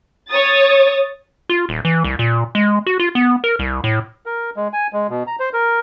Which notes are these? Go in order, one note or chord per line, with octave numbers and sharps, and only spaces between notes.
C#5 D#6 A6
F4
D#1
E3
C2
A#2
G#3
F#4
F4
B3
A#4
C2
A2
A#4
G#3
G#5
G#3
B2
A#5
C5
A#4